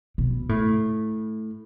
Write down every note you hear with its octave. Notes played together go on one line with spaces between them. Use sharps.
B2
A2